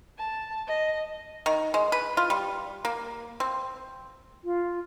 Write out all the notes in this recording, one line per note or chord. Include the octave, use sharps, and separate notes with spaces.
A5
D#5
D#3
G#3
B4
F4
G3
A#3
C4
F4